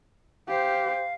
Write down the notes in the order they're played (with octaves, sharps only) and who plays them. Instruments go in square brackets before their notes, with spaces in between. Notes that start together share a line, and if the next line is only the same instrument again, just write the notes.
[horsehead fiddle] G4 C5 [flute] F5